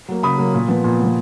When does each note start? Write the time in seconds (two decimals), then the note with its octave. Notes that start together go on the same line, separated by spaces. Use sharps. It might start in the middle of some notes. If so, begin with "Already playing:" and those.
0.08 F#3 A#3
0.23 C#3 B5 D#6
0.39 F#3 A#3
0.54 A#2
0.68 F3 B3
0.84 A#2
1.00 F3 B3